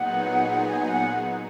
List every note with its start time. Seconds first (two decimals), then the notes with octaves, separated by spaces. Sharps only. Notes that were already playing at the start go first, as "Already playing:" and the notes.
Already playing: A#2 F#3 B3 D#4 G#4 F#5
0.66 G#5
0.88 F#5